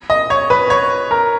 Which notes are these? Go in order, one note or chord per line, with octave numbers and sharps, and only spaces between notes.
D#5
C#5
B4
C#5
A#4